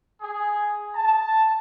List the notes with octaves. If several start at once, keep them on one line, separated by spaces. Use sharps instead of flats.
G#4
A5